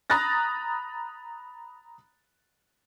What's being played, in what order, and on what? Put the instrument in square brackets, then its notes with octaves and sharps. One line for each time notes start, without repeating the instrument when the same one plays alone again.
[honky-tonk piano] A#5 B5 D#6 F#6 A6 A#6